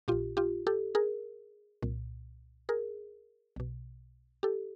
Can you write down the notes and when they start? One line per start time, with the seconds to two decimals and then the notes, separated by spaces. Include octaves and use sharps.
0.08 A#1 A#2 F4 G4
0.37 F4 G4
0.67 G4 A4
0.95 G#4 A#4
1.82 C2 A#2
2.69 G#4 A#4
3.56 B1 B2
4.43 G4 A4